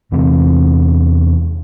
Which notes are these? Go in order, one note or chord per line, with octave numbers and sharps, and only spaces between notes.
E2 C3 E3 C4